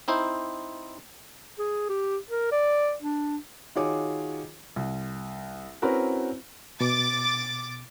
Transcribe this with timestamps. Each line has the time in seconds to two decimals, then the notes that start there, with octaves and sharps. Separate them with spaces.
0.08 C4 D#4 E4 C5
1.59 G#4
1.89 G4
2.31 A#4
2.52 D5
3.02 D4
3.75 D#3 F4 F#4 G#4 C#5 D6
4.76 C2
5.82 C4 C#4 E4 F#4 A#4 B4
6.81 B2 D6 A6